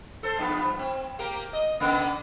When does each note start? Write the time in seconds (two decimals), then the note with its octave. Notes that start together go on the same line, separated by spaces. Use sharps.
0.23 A4 C5
0.39 G2 F3 B3
0.79 C4
1.19 A#3 G4 A#4
1.53 D#5
1.80 C#3 A#3 B3